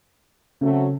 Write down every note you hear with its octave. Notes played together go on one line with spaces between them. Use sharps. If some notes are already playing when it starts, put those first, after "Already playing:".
C#3 F#3 A3 C4